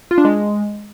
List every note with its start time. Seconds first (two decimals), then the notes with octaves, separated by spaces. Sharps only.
0.11 F4
0.18 D4
0.25 G#3